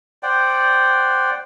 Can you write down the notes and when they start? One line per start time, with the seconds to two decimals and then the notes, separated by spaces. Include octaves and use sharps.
0.23 C5 D5 F#5 G5